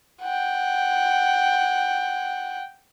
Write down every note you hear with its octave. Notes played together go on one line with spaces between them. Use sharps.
F#5 G5